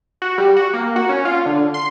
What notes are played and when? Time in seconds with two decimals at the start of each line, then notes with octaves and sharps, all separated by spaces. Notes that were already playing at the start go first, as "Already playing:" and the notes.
0.22 F#4
0.38 G3
0.56 F#4
0.73 A#3
0.96 F#4
1.09 C#4
1.25 F4
1.46 D3
1.74 C6